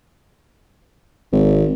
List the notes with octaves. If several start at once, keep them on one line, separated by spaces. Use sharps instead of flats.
G#1